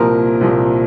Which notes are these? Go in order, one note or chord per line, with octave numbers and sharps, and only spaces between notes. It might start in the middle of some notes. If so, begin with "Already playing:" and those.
Already playing: C2 A#2 F3 A#4
C2 A#2 F3